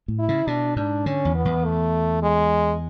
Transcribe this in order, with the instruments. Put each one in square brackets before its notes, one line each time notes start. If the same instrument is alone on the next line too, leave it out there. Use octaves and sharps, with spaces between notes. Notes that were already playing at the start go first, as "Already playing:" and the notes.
[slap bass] A2
[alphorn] E4
[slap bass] C#3
[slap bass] B2 [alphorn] D4
[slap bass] G#2 [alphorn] D4
[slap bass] D3 [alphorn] C#4
[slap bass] E2
[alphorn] B3
[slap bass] E2
[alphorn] A3
G#3